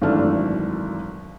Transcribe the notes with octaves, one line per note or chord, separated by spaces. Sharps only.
G#1 F#2 E3 A3 D4 F6